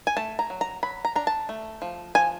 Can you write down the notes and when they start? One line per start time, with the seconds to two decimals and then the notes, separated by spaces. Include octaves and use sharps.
0.07 G#5
0.17 A3 A5
0.39 A#5
0.50 F#3
0.61 A#5
0.83 F#3 B5
1.05 A#5
1.16 D4 A#5
1.27 A5
1.49 A3
1.82 F3
2.15 F3 G#5